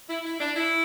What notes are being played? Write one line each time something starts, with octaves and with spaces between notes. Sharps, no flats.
E4
E4
D4
E4